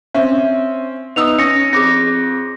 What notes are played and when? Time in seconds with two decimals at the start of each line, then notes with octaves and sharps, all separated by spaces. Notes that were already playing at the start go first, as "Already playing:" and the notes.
0.14 C4 C#4 E5
1.16 B3 D#4 D#6 E6 F7
1.38 C#4 A#6 C#7
1.73 F2 G#4 D6 A#6